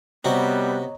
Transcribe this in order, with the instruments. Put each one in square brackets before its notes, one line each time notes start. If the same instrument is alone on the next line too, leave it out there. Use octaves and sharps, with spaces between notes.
[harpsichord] C3 F#4 [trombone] G3 [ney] B3 [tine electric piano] C#5 D#5 A#5